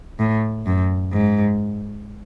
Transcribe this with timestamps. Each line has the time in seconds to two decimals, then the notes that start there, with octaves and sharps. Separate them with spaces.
0.19 A2
0.66 F#2
1.13 G#2